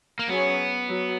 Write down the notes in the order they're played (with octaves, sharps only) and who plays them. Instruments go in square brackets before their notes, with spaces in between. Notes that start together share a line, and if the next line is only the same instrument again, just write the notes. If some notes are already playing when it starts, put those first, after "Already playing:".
[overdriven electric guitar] A#3
[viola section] F#3 C#4 G#4 C#5 [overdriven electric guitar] B3
[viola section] F#3